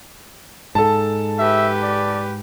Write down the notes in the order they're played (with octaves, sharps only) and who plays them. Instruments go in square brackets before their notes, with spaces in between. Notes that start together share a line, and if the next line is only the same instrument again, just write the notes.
[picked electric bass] G#2 [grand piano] A4 A5
[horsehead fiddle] G4 B4 [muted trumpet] E5
[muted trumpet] D5